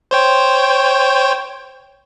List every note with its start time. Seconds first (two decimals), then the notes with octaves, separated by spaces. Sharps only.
0.11 C5 C#5 G5